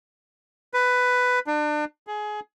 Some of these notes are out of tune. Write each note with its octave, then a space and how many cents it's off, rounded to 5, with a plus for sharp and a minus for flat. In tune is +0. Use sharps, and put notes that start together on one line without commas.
B4 +10
D4 +35
G#4 +20